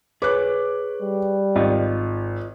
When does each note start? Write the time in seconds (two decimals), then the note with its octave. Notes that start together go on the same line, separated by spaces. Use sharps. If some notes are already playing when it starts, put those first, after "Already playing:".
0.22 G#4 B4 C#5 D6 F#6
1.02 G3
1.56 G#1 F4 D#5